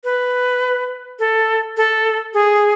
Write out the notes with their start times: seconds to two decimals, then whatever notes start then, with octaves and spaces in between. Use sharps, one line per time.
0.04 B4
1.19 A4
1.77 A4
2.34 G#4